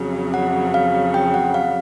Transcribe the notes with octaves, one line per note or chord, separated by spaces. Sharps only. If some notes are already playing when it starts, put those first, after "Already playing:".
Already playing: F2 C#3 F#3
F#5
F5
G5
F#5
F5